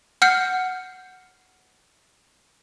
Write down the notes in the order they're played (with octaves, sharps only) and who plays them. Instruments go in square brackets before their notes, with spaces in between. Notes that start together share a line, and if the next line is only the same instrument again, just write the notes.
[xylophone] F#5 F6 G6 C#7